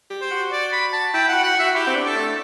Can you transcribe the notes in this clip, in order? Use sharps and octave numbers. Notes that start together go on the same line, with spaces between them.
G4
C5
F#4
D5
B5
A5
E4 G5
F#5
F#4
F#5
F#4 E5
E4 G4
C4
D4
A4
A3